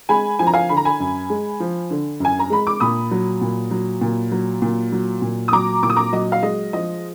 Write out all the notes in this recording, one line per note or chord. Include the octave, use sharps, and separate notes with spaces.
G#3 G#5 B5
F3 G#5
A#5
F5 G#5
D3 B5
A#5
G#5 B5
F#2
G#3
F3
D3
F#2 G#5
A#5
G#3 B5
D6
A#2 B5 D#6
F#3
A#2
F#3
A#2
F#3
A#2
F#3
A#2
D#6
F#3 A#5 D6
A#2 D6
D#6
A#5 D6
F#3 D#5
F5
G#3 D#5
F3 D#5